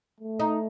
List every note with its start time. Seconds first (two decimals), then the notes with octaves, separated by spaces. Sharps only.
0.20 A3
0.40 D#4